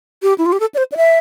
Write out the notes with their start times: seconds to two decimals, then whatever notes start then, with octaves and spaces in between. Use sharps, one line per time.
0.23 G4
0.38 E4
0.46 F4
0.52 G4
0.60 A4
0.75 D5
0.78 C5
0.92 D5
0.97 E5